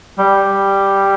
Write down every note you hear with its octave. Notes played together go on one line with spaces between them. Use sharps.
G3